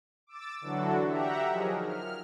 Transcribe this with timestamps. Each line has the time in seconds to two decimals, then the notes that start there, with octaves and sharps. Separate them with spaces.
0.27 D6 E6 A6
0.61 D3 E3 F#3 D4 F#4 A4
1.06 G4 E5 F#5 A#5
1.49 F3 F#3 D#4 G#4 A#4
1.82 F6